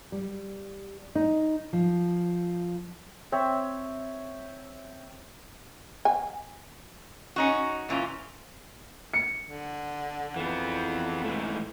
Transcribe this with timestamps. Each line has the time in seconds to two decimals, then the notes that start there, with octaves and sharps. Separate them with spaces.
0.12 G3
1.15 D#4
1.73 F3
3.32 C4 C#5 E5
6.05 G#5
7.36 C#4 D#4 F#4
7.89 A#2 E3 C#4 F4
9.14 C#7
9.46 D3
10.36 F2 E3 B3
11.24 G#2 E3 A3